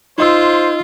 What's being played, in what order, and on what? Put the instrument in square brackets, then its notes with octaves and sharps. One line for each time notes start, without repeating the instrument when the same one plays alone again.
[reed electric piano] D#4 D#5 E6 [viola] F4 [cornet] C5